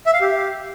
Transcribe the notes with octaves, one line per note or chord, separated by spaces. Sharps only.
E5
F5
G4